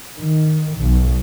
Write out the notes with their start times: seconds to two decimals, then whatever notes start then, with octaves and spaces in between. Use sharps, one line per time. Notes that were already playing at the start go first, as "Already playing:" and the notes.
0.17 D#3
0.78 B1